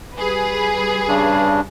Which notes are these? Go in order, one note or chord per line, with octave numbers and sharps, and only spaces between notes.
G3 G#4 B4
G2 C#3 D4